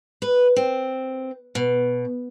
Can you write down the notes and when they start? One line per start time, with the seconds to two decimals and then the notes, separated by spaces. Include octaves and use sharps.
0.22 B4
0.56 C4
1.55 B2